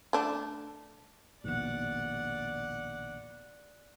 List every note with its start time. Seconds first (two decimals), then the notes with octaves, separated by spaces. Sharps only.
0.13 A3 D4
1.44 A#1 D#2 B2 D5 F#5